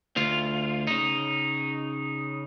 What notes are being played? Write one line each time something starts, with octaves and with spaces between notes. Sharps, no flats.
D2 F4
C#3 D#4